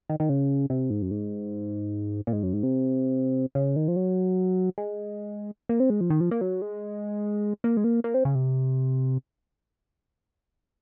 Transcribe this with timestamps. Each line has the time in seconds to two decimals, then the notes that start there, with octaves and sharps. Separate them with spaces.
0.10 D#3
0.20 D#3
0.29 C#3
0.70 C3
0.90 G#2
1.02 F#2
1.11 G#2
2.27 A#2
2.33 G#2
2.43 F#2
2.53 G#2
2.63 C3
3.55 C#3
3.76 D#3
3.88 F3
3.96 F#3
4.78 G#3
5.69 A#3
5.80 C4
5.90 G#3
6.01 F3
6.10 D#3
6.21 F3
6.31 A#3
6.41 F#3
6.62 G#3
7.64 A#3
7.77 G#3
7.84 A#3
8.04 A#3
8.14 C4
8.25 C#3
8.35 C3